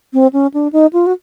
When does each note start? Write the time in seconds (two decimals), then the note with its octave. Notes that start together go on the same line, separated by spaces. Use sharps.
0.13 C4
0.33 C#4
0.54 D4
0.73 D#4
0.93 F4
1.07 F#4